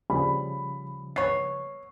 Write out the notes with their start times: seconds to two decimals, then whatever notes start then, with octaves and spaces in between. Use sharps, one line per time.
0.10 C#3 F3 G3 B5
1.16 B3 C#5 C7